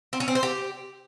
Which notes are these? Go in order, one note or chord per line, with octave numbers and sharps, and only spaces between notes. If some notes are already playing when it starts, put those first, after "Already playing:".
C4
C#4
C4
C5
G4